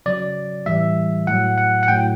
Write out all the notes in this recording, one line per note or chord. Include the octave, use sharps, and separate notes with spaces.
C#3 F#3 D5
A2 E3 G3 E5
A2 F#3 F#5
F#5
F#5
A2 F#3 G5